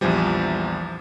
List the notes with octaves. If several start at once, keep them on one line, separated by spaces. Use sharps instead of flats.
A#1 E2 E3 F3 G3